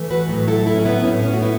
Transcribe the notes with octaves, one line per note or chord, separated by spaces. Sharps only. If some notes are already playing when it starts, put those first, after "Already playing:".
Already playing: E3 A3
F#4 B4
A2 F#3 A3
E4 A4
E4
C#4
B3 E4
A2 A3 C#4
B3
C#4
F#4
B3 E4